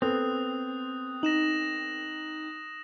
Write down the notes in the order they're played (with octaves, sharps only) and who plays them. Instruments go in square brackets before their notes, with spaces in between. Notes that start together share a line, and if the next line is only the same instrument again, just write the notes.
[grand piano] B3 A4 [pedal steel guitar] C4 [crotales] D#6 F#6
[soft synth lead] D#4 [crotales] A#6 E7 F#7